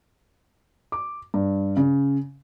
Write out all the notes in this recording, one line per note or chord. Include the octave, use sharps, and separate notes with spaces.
D6
G2
C#3